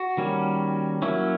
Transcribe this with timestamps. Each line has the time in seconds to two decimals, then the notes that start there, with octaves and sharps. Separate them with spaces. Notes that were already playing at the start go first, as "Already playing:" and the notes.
Already playing: F#4
0.17 D#3 G3 A#3 C#4
1.02 F#3 A#3 C#4 E4